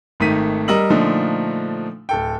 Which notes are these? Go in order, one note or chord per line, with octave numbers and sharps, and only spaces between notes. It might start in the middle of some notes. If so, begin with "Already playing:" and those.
G#1 D#3 A3 B6 D#7
G3 A#4 D#5 E6 F#7
A#2 D3 F3 A3 D4 D#4
D1 A4 G5